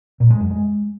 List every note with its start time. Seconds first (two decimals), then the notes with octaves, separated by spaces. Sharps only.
0.20 A#2
0.30 G#3
0.40 F#2
0.51 G#3